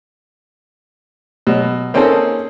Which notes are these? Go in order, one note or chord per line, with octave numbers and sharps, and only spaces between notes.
B2 F#3
A#3 C4 C#4 D#4 G#4 A4